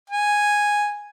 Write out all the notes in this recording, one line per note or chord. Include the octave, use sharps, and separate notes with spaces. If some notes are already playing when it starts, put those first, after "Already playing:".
G#5